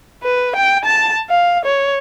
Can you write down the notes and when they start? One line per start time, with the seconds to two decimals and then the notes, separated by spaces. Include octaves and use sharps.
0.23 B4
0.56 G5
0.85 A5
1.30 F5
1.65 C#5